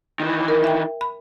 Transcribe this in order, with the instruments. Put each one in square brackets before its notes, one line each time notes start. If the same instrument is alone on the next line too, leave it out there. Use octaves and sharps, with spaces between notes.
[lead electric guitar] D#3 E3
[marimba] A#4
E5 G5
B5